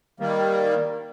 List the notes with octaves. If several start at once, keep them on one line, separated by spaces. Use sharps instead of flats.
D#3 G3 A#3